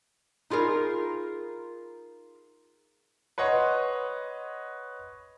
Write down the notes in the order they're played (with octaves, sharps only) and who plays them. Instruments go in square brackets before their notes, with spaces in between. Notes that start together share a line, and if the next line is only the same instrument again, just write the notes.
[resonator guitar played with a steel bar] D#4 F4 G#4 A#4
[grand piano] B4 C#5 D#5 F#5 C6